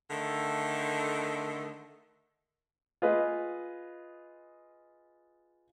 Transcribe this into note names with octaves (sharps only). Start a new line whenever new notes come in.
D3 D#3 A3 A4
F4 G#4 B4 D#5